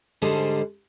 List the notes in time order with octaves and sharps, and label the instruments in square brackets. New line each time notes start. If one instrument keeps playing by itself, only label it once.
[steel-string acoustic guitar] G#2 D3 G3 G#4 C5 A5